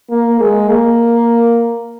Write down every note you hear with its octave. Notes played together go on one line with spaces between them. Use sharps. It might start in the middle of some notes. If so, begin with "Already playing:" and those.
A#3
G#3
A#3